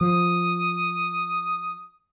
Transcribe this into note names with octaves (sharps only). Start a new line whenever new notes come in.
F3 D#6